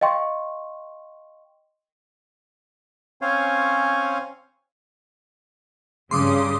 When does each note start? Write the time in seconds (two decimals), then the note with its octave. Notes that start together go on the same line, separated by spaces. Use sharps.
0.01 D#5 F5 G5 C6 C#6
3.22 C4 C#4 C5 C#5 F5 G#5
6.11 G2 C#3 C6 D6 D#6